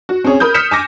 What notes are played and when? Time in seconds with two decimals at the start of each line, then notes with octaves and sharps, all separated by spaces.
0.09 F#4
0.24 C4 C#4 G#4 C#5
0.40 A#4 B5 D#6 G6
0.54 D#6 F6 G6 B6 C#7 E7
0.71 G#5 D6 A#6